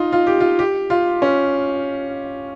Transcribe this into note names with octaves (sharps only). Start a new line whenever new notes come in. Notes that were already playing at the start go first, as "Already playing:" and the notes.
Already playing: D#4 F4
F4
G4
F4
G4
F4
C#4